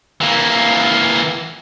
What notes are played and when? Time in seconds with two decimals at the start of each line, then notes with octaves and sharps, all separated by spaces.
0.21 E3 A#3